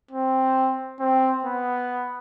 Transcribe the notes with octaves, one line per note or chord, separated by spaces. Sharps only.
C4
C4
B3